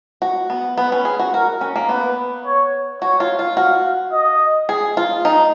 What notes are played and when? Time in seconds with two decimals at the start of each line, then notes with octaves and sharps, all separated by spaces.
0.22 F#4
0.50 B3
0.77 B3 B4
0.92 C#4
1.05 G#4
1.19 F#4
1.34 F#4 A#4
1.61 C#4
1.76 A#3
1.89 B3 B4
2.45 C#5
3.02 F#4 C#5
3.20 F4
3.39 F4
3.57 F#4 F5
4.13 D#5
4.69 G#4
4.97 F4
5.25 D#4